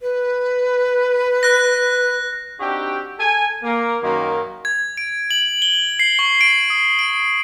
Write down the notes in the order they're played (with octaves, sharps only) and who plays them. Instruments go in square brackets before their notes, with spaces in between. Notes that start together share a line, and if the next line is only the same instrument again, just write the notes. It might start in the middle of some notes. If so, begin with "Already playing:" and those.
[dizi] B4
[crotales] F#6 A#6
[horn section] C4 D4 D#4 F#4 G4
A4 G#5
A#3
F#2 D#3 A#3
[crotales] G#6
D7
F#7
G7
C7
C#6
D7
D#6
D7